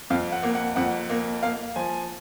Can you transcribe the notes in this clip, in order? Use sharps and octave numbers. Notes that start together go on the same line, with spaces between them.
F2 F5
F#5
A#3
F#5
F2 F#5
A#3
A#3 F5
F3 G#5